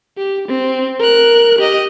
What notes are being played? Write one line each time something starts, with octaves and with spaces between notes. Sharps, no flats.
G4
C4
A#4 F#6
G4 D#5